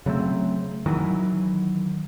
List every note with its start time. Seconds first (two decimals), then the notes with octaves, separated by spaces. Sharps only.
0.06 C#3 F#3 A3 C4
0.86 D#3 E3 F#3